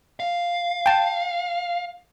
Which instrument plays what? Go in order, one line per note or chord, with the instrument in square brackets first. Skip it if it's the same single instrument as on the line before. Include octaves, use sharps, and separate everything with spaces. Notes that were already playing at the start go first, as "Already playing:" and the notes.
[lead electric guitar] F5
[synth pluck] G5 A5